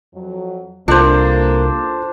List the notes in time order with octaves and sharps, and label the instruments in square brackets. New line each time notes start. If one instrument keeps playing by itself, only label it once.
[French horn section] F2 F#3
[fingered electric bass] C2 [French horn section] A#3 [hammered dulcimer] D4 C5 [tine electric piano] F4 A4